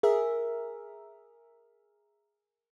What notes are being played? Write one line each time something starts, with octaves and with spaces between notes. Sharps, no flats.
G#4 A#4 E5